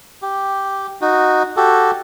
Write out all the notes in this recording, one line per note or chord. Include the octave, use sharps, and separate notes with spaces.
G4
D#4 F#4
F#4 G4 A4